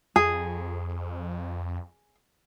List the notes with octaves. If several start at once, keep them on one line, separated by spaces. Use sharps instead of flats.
F2 G#4